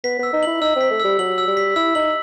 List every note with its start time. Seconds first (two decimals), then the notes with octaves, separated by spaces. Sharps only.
0.04 B3 B6
0.19 B3 E6
0.33 D#4
0.43 E4 F#7
0.61 D#4 E6
0.76 C4 B6
0.91 A3
1.00 G3 E6
1.19 F#3 F#7
1.38 E6
1.47 G3
1.57 B6
1.76 E4 E6
1.95 D#4 F#7